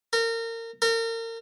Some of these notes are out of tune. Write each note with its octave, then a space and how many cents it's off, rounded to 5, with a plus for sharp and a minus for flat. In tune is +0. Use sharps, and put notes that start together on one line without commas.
A#4 -30
A#4 -35